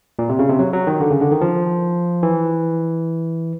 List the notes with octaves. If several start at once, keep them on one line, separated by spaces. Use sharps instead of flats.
A#2
C3
C#3
C3
F#3
F#3
D#3
D3
C#3
D3
D#3
F3
E3